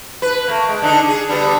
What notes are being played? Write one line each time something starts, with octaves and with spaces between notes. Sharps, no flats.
B4
A3 A#3
G#3
D3 D4 D#4
G#4
D3 G3 B3